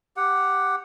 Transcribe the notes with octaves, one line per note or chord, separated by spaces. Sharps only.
G4 F#5